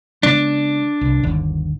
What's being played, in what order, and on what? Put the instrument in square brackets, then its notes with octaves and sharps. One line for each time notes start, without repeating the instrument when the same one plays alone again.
[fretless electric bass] C#3 G#3 B3 [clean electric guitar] D4
[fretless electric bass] C2
G1 D#2 D3